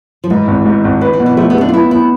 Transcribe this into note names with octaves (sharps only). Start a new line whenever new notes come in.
F3
G#2 E3
G#1
G#2
G#1
D3 B4
E3
B2
E3
F3 A3
B3
A3
D4
F4
B3 E4
B3 E4